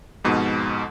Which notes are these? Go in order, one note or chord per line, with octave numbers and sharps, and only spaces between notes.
F2 G#2 B2